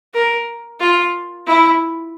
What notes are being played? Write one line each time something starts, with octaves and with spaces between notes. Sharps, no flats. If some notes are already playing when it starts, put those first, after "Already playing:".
A#4
F4
E4